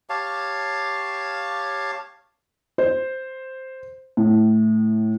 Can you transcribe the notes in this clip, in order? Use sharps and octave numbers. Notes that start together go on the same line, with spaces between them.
G4 C#5 F5 A5
C5
A2